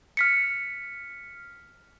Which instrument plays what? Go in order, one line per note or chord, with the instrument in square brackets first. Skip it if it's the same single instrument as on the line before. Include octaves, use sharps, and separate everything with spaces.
[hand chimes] F6 B6 C#7